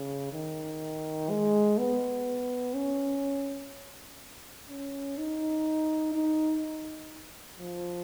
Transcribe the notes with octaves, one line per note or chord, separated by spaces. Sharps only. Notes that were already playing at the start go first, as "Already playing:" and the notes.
Already playing: C#3
D#3
G#3
B3
C#4
C#4
D#4
D#4
F3